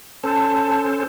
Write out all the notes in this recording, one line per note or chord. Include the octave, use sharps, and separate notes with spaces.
C#4 A4 C5 A5